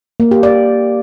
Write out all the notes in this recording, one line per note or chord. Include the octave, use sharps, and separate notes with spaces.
A#3
G4
D5